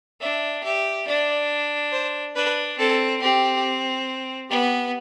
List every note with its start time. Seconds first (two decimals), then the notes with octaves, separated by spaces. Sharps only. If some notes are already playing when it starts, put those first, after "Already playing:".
0.20 D4 E5
0.63 G4 E5
1.07 D4 D5
1.92 C5
2.35 D4 B4
2.78 C4 A4
3.21 C4 G4
4.50 B3 G4